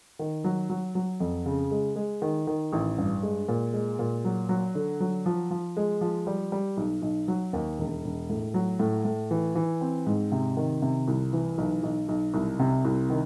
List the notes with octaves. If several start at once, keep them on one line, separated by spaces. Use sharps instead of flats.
D#3
F#3
F#3
F#3
F2
C#3
G#3
G#3
D#3
D#3
A1
G2
G#3
A#2
G#3
A#2
F#3
F#3
D3
F#3
F3
F3
G#3
F3
G3
G3
B1
B1
F#3
D#2
E1
E1
A2
F#3
A2
A2
E3
E3
C4
G#2
C3
D#3
C3
C2
E3
B1
B1
B1
C2
C3
C2
D#3